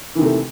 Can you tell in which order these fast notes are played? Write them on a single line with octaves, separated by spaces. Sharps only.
E3 D#3 C3 A3